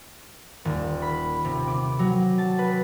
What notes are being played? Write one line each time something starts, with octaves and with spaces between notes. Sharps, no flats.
D#1
B5
C3
D6
F#3
A5
B4